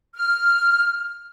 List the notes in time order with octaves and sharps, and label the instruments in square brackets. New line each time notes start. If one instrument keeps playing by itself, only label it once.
[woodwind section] F6